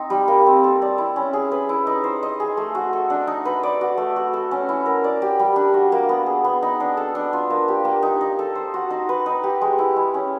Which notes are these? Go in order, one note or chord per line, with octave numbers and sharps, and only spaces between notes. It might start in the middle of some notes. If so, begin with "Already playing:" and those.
Already playing: C4 D#4
G3
A#3
C4
A4
D5
E4
C#4
G#4
B4
E4
D#4
C5
D#5
G#4
A3
F#4
A4
D4
D#4
B4
D5
F#4
A3
F#4
A4
C#4
E4
A#4
D5
G4
G3
D4
F#4
A#3
B3
G#4
B3
D#4
D4
A4
D4
F4
A#3
G4
A#3
D#4
D#4
A4
C5
F#4
D#4
B4
D#4
G4
G#3
E4
G#3
C#4